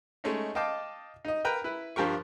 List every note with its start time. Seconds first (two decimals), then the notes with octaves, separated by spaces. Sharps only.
0.24 G#3 A3 C#4 D#4
0.55 D#5 F5 G5 A5 D6
1.25 D#4 D#5
1.45 A#4 B4 G5 A#5
1.64 E4 B4
1.96 G2 F3 G4 A#4 C#6